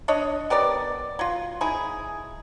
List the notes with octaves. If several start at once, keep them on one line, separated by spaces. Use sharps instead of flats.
D4 C#5 D#5
B3 G4 A#4 D5
F#3 F4
D#4 E4 G#4